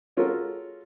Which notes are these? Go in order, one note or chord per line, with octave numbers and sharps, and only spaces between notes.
G#3 C#4 F4 F#4 A4 A#4